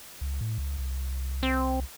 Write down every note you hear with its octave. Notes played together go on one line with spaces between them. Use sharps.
C#2
A2
C#2
C2
C4